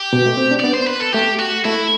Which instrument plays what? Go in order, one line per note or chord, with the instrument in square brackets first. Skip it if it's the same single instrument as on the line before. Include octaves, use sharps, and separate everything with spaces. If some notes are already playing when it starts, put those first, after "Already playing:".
Already playing: [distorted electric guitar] G4
[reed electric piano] B2
A3
C4
D4
[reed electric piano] B3 [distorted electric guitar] D5
[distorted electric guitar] C5
B4
A4
[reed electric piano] A3 [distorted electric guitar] G4
[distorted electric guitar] F#4
[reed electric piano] A3 [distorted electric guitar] E4